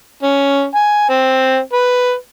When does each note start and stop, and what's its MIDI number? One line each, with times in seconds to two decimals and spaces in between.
0.23 0.66 61
0.75 1.06 80
1.10 1.58 60
1.73 2.13 71